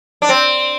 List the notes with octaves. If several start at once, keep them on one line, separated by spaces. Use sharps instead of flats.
D4
C4